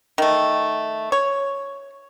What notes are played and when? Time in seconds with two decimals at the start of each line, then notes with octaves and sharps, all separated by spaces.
0.18 D#3 A3
1.12 C#5